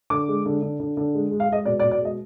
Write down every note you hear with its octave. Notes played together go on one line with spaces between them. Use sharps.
D3 D6
G#3
D3
D3
D3
D3
G#3
G#3
F5
G#3 D#5
B2 D5
D5
B2
D5
G#3 D#5